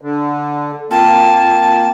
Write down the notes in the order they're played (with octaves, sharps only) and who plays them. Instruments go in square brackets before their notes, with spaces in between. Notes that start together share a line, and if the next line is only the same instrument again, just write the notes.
[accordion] D3
[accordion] A#3 [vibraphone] C4 F4 G5 [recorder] A5